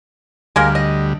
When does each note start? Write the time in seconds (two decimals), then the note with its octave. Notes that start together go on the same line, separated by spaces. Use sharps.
0.56 D2 G3 G#3 A#3 A#4
0.75 D#5